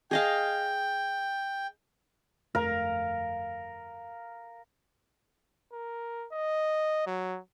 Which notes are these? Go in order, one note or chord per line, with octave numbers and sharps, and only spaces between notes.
G#4 D#5 F5 G5
G1 F2 A3 A#4 F5
A#4
D#5
F#3